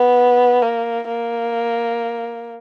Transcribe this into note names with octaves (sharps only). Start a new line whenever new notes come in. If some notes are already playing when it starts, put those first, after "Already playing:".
Already playing: B3
A#3
A#3